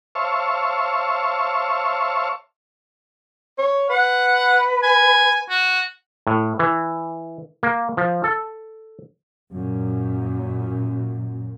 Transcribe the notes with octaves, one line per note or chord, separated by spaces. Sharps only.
C5 C#5 E5 F5 A5 C#6
C#5
B4 F#5
G#5
F#4
A2
E3
A#3
F3
A4
F#2 A#2